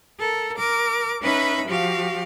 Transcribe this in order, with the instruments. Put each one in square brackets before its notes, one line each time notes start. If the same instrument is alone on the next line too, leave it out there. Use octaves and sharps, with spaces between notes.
[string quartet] A4 A#4
A#4 D6
C#4 D#4 B4 E5 B5
F3 F#4 G4 F5